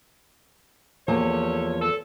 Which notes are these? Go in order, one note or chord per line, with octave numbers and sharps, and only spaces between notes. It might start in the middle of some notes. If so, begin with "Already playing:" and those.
E2 F3 A#3 G4 A4 C#5
A4